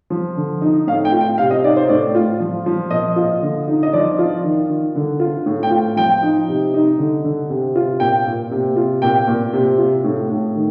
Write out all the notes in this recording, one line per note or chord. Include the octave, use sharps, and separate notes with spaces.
F3
D3
D#4
A2 F5
G5
F4
G5
C3 F5
D#5
D#4 D5
C5
A2 D5
F4
F3
F3
A#2 D#5
F4
D3
D#4
D#5
F3 D5
F4
D#3
D#3
D3
F4
A2
G5
F4
F3 G5
D#4
C3
D#4
D3
D3
C3
F4
A#2 G5
A#2
C3
F4
A#2 G5
A#2
C3
F4
A2
A2
D#3